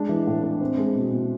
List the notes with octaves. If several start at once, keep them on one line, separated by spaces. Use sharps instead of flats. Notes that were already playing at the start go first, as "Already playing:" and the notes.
Already playing: G#3 D4
E3
A2
D4
C4
G#3
B2
B2